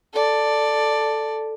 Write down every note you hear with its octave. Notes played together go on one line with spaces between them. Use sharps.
A4 D5